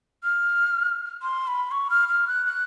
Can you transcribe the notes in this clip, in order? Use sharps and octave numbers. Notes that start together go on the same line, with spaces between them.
F6
C6
B5
C#6
F6
F6
F#6
F#6